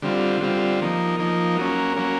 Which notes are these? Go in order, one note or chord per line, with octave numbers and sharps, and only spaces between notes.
D3 G3 C4 F4
D3 G3 C4 F4
F3 A#3 D#4
F3 A#3 D#4
F#3 A#3 C#4
F#3 A#3 C#4